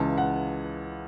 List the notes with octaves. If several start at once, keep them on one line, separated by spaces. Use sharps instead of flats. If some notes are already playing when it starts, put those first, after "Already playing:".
Already playing: C#2 C#3 E3 A5
F#5